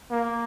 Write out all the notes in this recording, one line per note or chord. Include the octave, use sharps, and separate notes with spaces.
A#3